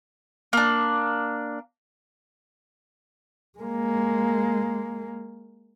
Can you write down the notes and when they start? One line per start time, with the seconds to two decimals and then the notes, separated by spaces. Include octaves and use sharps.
0.53 A#3 D4
3.59 G#3 A#3